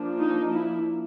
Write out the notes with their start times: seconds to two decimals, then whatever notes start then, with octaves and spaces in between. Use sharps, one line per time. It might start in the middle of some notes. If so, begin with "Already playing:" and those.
Already playing: F3 A#3 D4
0.20 D#4
0.52 E4